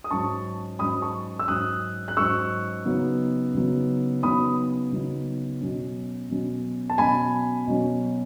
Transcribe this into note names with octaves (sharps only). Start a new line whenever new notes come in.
D#6
G#2 F#3 C#4 A5 C#6
G#2 F#3 C#4 B5 D#6
A5 C#6
E6
G#2 F#3 C#4 D#6 F#6
F#6
G#2 F#3 C#4 C#6 E6
C#3 F#3 B3 D#4
C#3 F#3 B3 D#4
C#3 F#3 B3 D#4 B5 D#6
C#3 F#3 B3 D#4
B2 F#3 C#4
B2 F#3 C#4
A5
B2 F#3 C#4 G#5 B5
B2 F#3 C#4